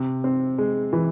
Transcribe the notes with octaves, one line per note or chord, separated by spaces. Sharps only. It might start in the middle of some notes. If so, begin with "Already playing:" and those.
Already playing: C3
C4
G#3
E3